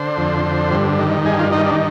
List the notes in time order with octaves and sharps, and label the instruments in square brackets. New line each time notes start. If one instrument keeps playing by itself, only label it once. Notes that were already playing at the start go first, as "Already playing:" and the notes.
Already playing: [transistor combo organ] D3 C5
F2
D3
G2
D#3
G2 G#4
F4
D#3 D#4
D4